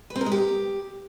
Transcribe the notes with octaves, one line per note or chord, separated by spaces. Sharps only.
B4
C4
A#4
G#3
G4